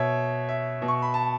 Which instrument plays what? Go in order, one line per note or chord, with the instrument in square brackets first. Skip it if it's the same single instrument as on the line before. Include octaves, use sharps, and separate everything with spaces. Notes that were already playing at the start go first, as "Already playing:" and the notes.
Already playing: [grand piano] B2 C#5 E5
E5
B2
C#6
B5
A5